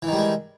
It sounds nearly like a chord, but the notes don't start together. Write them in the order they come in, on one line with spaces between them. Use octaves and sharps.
E3 D#3 G3 G#3